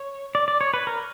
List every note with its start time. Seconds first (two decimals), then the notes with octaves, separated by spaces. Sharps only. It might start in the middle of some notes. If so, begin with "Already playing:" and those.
Already playing: C#5
0.35 D5
0.48 D5
0.61 C#5
0.74 B4
0.87 A#4